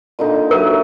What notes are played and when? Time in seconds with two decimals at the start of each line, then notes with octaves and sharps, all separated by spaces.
0.19 A#2 D3 D#4
0.51 F#3 A#4 E5